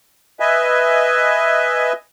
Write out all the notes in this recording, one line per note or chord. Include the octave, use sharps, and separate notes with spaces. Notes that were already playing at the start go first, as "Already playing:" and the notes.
B4 D#5 E5 G#5